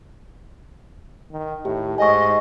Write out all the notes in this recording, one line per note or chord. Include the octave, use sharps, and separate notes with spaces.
D#3
A2 G4
G#2 D#5 G#5 C#6